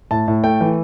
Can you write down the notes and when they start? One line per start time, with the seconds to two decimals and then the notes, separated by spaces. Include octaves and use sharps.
0.11 A2 A5
0.28 A2
0.44 A3 G5
0.61 E3